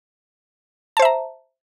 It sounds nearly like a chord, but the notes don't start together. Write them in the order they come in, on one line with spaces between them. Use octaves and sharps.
A5 C5 E5 A#5